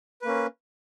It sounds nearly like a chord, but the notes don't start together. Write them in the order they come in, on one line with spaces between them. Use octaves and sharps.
B4 A#3 C#4